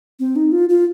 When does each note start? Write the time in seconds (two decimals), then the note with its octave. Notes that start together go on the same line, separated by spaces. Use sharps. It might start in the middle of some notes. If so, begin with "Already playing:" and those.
0.20 C4
0.36 D#4
0.52 F4
0.69 F4